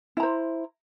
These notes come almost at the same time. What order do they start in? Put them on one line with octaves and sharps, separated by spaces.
E4 A#5 C5